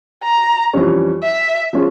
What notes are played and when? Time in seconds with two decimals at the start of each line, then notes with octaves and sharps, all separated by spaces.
0.24 A#5
0.73 F2 E3 G3 C#4
1.23 E5
1.73 F3 G#3 C#4